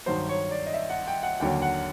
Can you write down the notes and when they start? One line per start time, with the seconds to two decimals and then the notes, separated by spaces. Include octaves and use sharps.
0.06 G2 D#3 F#3 C5
0.29 C#5
0.51 D5
0.66 D#5
0.74 E5
0.90 F#5
1.07 G5
1.23 F#5
1.40 D#2 D3 F#3 G5
1.62 F#5